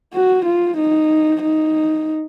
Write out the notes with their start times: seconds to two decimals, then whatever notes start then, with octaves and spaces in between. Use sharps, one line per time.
0.14 F#4
0.46 F4
0.77 D#4
1.42 D#4